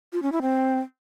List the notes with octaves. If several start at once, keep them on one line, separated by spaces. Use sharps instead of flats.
F4
C#4
E4
C4